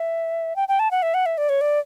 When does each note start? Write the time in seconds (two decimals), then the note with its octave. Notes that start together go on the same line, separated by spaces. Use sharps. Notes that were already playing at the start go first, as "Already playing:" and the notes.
Already playing: E5
0.56 G5
0.68 G5
0.79 A5
0.91 F#5
1.02 E5
1.14 F#5
1.26 E5
1.38 D5
1.49 C#5
1.61 D5